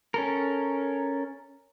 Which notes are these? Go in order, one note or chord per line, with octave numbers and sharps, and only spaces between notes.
C#4 A4 A#4